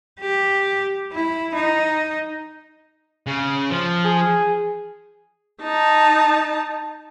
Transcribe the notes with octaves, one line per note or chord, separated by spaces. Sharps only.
G4
E4
D#4
C#3
F3
G#4
D#4 A5